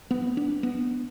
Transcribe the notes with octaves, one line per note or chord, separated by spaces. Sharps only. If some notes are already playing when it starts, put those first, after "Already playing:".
B3
D4
B3